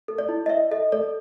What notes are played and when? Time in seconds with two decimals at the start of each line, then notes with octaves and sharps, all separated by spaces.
0.08 A4
0.18 D5
0.29 E4
0.46 D#5
0.49 D5 E5
0.71 A4 D#5
0.92 A4 D5